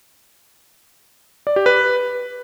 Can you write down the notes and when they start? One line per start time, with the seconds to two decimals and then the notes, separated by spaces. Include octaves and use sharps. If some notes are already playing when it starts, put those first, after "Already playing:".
1.47 D5
1.56 G4
1.66 B4